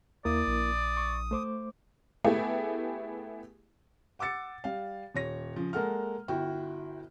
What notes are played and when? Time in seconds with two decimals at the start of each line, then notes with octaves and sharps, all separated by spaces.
0.25 D#2 A#3 E4 A#4 D5 D#6
0.47 A#1
0.97 C#6
1.31 A3 C5 D6
2.24 A3 B3 E4 G4 G#4
4.19 F#5 D6 E6 A6 C#7
4.64 G3 F5
5.15 D#1 C#5 A#6
5.56 C#3 F3
5.73 G#3 A#3 A4 F#5 F6
6.28 G1 E4 F#4 G5